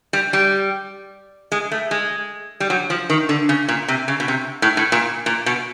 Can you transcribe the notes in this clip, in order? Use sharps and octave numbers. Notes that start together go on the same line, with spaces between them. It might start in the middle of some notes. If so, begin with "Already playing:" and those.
G3
G3
G#3
A3
G#3
G3
F#3
F3
D#3
D3
C#3
A#2
C3
C#3
B2
C3
A2
A2
A#2
A#2
B2